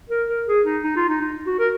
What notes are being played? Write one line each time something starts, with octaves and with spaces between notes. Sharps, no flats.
A#4
A#4
G#4
D#4
D#4
F4
D#4
D#4
F#4
A#4